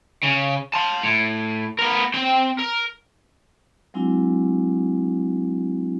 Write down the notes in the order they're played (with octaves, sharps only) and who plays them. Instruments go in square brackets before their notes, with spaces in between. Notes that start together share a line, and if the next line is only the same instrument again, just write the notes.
[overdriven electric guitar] C#3
A5 C6
A2
B3 A#4
C4 G5
A#4
[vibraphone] F#3 G#3 C4 D4 E4 F#4